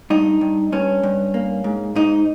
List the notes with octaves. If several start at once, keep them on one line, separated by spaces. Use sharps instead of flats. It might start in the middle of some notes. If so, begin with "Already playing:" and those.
G2 D#4
G2
G2 C#4
G2
A#3
G#2
G#2 D#4